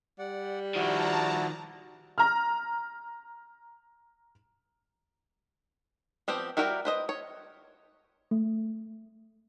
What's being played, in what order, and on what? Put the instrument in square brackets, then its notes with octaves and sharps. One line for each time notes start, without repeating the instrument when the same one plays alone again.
[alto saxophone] G3 [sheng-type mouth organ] D5 F#5
[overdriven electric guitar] D#3 F3 [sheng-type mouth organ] E4 F#4 D5 [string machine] A5 A#5
[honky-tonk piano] A#5 F6
[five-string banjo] F3 B3 C4 G4
G3 E4 F#4 A#4 G5
B4 C5 D#5
C#5
[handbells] A3